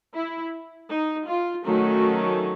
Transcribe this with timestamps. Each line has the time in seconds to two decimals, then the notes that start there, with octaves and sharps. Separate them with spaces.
0.14 E4
0.90 D#4
1.27 F4
1.64 D#3 F#3 A3 C#4 F#4